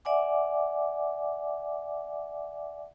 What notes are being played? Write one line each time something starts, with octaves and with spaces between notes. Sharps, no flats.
D5 E5 F#5 G#5 D6